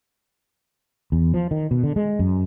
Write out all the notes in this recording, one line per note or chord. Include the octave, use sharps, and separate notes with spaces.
E2
F3
D#3
B2
D3
G#3
F#2